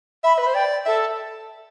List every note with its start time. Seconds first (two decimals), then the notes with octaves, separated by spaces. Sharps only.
0.24 E5 B5
0.39 B4 B5
0.47 C5
0.54 D5 G5
0.86 A4 E5